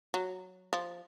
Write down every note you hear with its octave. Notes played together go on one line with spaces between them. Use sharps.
F#3
F3